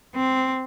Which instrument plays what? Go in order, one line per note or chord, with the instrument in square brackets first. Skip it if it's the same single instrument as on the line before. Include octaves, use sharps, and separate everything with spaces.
[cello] C4